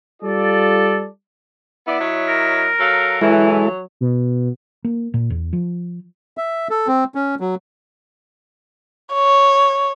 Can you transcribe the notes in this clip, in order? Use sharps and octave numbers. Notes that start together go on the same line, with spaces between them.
G3 F4 A4 D5
B3 E4 D5
F#3 C#5 D#5
A#4
F#3 A4 F5
E3 F#3 G#3 E4 A4
B2
A#3
A#2
E2
F3
E5
A4
C4
C#4
F#3
C#5